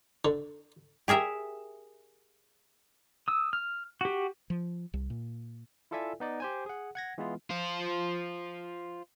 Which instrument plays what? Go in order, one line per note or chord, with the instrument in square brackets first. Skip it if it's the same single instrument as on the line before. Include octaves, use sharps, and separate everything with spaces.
[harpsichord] D3
[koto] G4 G#4 A#4 E5
[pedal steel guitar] D#6 E6
F6
F#4 G4
[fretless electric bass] F3
C2
A#2
[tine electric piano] E4 F4 A4 D5 E5 G#5
B3 D#4 D5
G4 C5 G#5
G#4 F#5
F#5 G#6 A#6
E3 G#3 B3 E4 F4
[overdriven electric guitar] F4 C5